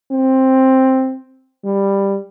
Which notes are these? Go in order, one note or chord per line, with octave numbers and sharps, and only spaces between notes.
C4
G3